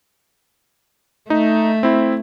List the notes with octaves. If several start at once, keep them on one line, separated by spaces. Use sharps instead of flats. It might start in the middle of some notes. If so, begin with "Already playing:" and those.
A3 D#4
C4 E4